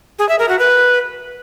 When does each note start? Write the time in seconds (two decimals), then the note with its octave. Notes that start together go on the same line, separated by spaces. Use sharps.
0.19 G#4
0.29 E5
0.39 A#4
0.49 F#4
0.59 B4